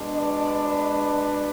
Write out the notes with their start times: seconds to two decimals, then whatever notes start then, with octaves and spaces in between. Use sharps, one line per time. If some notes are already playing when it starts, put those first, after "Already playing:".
Already playing: B2 G#3 D4
0.14 B4 D5
0.68 B4 D5